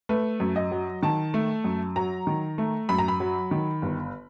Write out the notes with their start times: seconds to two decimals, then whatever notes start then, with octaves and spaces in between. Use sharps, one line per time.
0.09 A3 B4
0.40 F#2
0.56 D#5
0.71 F#3
1.03 D#3 A5
1.34 A3
1.64 F#2
1.96 F#3 A#5
2.27 D#3
2.58 A3
2.89 F#2 B5
2.98 A#5
3.08 B5
3.20 F#3
3.51 D#3
3.82 G1